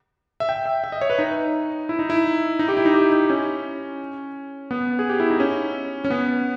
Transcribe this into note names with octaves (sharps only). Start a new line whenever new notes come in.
E5
G5
E5
E5
D#5
C#5
B4
D#4
E4
D#4
E4
D#4
G4
E4
D#4
G4
D#4
C#4
B3
G#4
G4
E4
D#4
C#4
C#4
B3